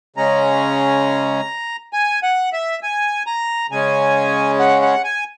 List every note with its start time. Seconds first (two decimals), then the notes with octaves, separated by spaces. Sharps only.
0.16 C#3 G#3 C#4 A#5
1.93 G#5
2.23 F#5
2.53 E5
2.83 G#5
3.27 A#5
3.70 C#3 G#3 C#4 G#5
4.59 F#5
4.82 F#5
5.04 G#5